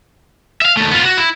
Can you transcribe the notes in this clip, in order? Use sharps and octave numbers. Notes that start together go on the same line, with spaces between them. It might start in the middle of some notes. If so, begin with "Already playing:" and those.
E5 F5
D#2 A3
B3 F4
F#4
E4